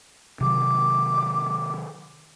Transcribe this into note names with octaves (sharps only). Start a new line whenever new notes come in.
C3 D#3 F#3 D6